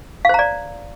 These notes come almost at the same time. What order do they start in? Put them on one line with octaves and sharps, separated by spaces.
F5 C5 A#5 D5